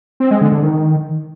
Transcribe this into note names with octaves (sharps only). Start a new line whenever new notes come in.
C4
G#3
D3
D3
D#3